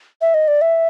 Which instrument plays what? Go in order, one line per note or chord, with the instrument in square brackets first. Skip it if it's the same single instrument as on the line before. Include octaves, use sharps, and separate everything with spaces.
[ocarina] E5
D#5
D5
E5